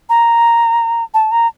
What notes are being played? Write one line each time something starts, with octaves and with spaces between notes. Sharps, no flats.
A#5
A5
A#5